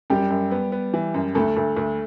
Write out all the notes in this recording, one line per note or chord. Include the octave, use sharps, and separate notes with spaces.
F#2 G3 G4
F#2
B3
B3
E3
F#2
D2 A3 A4
D2
D2